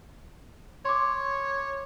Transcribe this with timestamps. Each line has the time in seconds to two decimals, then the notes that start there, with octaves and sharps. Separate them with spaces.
0.85 C#5 C6 D6